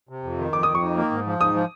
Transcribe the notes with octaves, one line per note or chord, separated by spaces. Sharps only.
C3
F2
D#3
F2 D6
D#6
F2
C#6
D#3
A#3
G#2
F3
G#2 D#6
F3